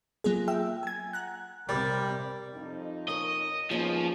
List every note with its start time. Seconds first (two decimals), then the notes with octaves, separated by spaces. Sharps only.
0.24 F#3 A#3 F4 G#4
0.48 E5 G5 E6
0.83 G#5 G#6
1.13 F#5 A#5 F#6
1.69 C3 G3 A#4 D5
2.53 F2 D#4
3.08 C#4 A#4 D#5
3.71 G#2 B2 F3 A#3 C#4 G#4 C#5